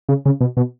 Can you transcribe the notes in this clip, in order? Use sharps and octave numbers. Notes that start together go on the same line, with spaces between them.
C#3
C#3
B2
B2